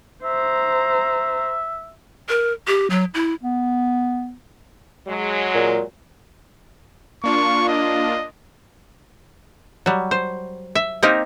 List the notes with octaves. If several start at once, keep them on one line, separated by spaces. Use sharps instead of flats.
C5 E5 A#5
A#4
G4
F#3
E4
B3
F#3 G#3
A#2
A#3 D4 F4 C#6
D#5
F#3 G3
C5
E5
A#3 C4 D#4 G4 A#4